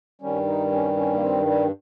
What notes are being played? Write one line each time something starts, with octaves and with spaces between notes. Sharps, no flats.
G2 D#3 G3 C#4
D#4
C#4
C#4
A#3
C4
G3